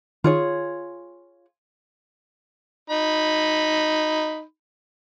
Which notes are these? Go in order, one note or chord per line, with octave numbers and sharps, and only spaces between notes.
D#3 F4 G#4 C#5
D#4 B5